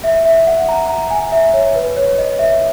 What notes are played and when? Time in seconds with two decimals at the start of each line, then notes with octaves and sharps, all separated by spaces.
0.04 E5
0.25 E5
0.47 F#5
0.69 A#5
0.89 A#5
1.11 G#5
1.32 E5
1.53 C#5
1.75 B4
1.97 C#5
2.18 D#5
2.39 E5